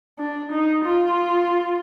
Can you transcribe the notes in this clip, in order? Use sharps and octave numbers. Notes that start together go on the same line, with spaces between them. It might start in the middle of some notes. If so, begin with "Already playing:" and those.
D4
D#4
F4